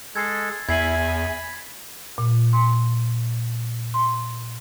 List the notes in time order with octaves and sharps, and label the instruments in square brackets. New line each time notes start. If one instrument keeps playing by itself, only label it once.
[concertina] G#3 A4 [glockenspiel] G#6 A6 C7
[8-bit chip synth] E2 [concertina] E4 B5 [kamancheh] E5 G#5 [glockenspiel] G#6 C7 F#7
[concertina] B5
[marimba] A#2
C6
C6